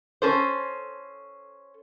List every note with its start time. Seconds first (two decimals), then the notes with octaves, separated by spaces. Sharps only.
0.22 C#4 A4 C5